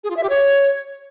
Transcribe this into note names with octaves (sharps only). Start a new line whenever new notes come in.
G#4
F4
E5
G4
C#5